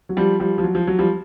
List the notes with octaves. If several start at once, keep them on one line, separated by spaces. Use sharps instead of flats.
F#3
F3 G3
F3 G3
F3
F#3
F3
F#3
F3 G3